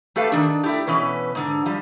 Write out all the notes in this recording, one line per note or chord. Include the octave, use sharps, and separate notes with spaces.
A3 G4 A4 B4 F5
D#3 E3 D4
A3 E4 G4
B2 E3 C#4 B4
G#2 D3
F3 G3